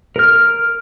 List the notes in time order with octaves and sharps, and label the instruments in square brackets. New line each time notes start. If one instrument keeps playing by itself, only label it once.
[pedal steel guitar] A#4 F6